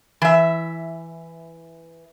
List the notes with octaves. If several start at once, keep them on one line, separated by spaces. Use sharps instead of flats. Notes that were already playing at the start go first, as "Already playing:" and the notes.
E3 E5